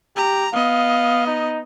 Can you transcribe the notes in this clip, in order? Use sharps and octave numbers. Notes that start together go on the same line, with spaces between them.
G4 A#5
B3 D#5 F5
D#4